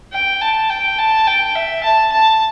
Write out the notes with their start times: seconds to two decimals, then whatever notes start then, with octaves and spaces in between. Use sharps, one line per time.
0.13 G5
0.42 A5
0.70 G5
0.99 A5
1.27 G5
1.56 E5
1.84 A5
2.12 A5